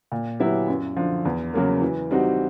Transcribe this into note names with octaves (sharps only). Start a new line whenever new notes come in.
A#2
F#3 B3 E4 G4
F#2
D3 F3
E2
C#3 F#3 A#3
E3
G3 C4 D#4 F#4